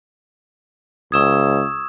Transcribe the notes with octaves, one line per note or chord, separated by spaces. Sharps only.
C#2 C#6 D#6 E6 G#6 E7